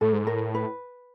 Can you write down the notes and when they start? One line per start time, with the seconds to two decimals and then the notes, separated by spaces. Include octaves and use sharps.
0.01 A2 A4
0.13 G#2
0.24 A2 A#4
0.54 B4